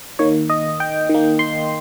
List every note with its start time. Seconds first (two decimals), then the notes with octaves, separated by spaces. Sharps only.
0.19 D#3 A#3 C#5
0.50 D#5
0.80 G5
1.10 D#3 A#3
1.39 C6